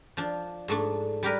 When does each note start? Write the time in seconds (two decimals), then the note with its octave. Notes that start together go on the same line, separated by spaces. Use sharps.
0.17 F3 D4
0.68 G#2 A3 D4
1.23 G3 G4 A#4 B4